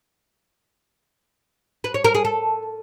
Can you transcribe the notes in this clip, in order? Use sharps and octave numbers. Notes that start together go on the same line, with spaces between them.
B4
C#5
A#4
G#4
A4